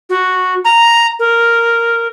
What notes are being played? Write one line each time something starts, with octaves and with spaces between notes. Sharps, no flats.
F#4
A#5
A#4